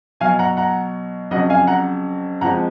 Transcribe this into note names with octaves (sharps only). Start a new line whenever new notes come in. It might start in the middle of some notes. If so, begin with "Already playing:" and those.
B2 F#3 F5 G#5
F#5 A#5
F#5 A#5
F2 C#3 F#3 D#5 F#5
F5 G#5
F#5 A#5
F2 F3 G#3 F#5 A#5